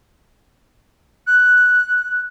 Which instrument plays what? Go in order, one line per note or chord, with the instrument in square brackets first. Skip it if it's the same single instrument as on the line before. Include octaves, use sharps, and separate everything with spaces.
[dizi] F#6